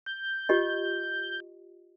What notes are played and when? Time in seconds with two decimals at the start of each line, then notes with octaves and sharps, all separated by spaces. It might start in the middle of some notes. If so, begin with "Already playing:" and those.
0.06 G6
0.49 F4 G4 D#5